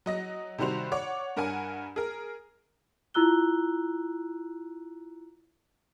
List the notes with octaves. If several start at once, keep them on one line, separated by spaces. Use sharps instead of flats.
F#3 D#5 A#6
C3 D#3 G3 F#4 C5 F7
C#5 D5 F#5 D6
G2 A#4 F#5 G#5
G#4 A#4
E4 F4 A#5 E6 F#6 G7